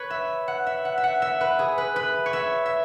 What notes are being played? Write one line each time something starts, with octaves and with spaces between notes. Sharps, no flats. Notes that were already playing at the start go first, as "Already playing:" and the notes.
Already playing: B4 C#5
E5
F#5
E5
F#5
E5
F#5
E5
B4
G#4
B4
B4
C#5
E5
E5